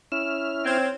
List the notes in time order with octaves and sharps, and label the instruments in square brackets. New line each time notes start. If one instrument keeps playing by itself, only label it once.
[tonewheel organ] C#4 E4 F6 [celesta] E7
[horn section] C4 [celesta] C#5 G#6 E7